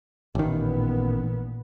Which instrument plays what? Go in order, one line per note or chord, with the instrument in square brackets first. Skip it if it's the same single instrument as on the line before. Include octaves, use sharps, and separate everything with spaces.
[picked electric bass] A1 D#3 [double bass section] A#2 B3